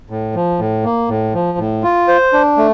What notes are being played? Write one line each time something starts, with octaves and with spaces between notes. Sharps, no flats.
A2
F3
A2
A#3
A2
F3
A2
F4
C5
D4
A3